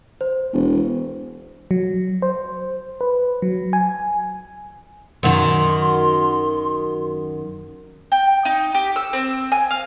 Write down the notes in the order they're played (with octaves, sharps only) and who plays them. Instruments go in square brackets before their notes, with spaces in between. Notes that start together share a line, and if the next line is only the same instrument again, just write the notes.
[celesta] C5
[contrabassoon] E1
[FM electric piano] F#3
C5
B4
F#3
G#5
[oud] F#2 D#3 [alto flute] C6
[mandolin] G5
D#4
G4
E6
C4
G#5
F5